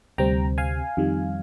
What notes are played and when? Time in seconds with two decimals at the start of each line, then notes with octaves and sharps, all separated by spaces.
0.18 D2 C3 G3 C4 G5 A#5
0.58 F5 G#5
0.97 F2 D#3 G3